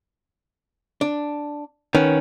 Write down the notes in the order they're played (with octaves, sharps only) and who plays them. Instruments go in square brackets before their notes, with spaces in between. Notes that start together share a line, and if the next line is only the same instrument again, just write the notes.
[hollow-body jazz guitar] D4
[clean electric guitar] D#3 C#4 [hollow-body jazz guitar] B3